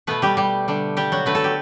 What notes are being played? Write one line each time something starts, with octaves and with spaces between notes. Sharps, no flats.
B2 A3 B3 B4
G3 G4
G3 G4
D3 G3
G3 G4
F#3 F#4
D3 A3 B4
A4
G4